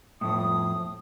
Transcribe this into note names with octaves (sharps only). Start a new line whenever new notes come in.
F2 A2 D#6